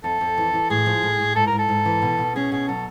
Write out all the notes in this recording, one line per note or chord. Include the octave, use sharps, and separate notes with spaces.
F2 A4
F2
E3
E3
A2 G#4
F3
A2
A2
G#2 A4
A#4
G#2
A4
G#2
E3
B2
B2
C#4 G#4
B2 G#4
F#3 A4